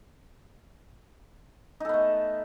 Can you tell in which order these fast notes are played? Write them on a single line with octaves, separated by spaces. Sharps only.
D#4 A4 B3 A3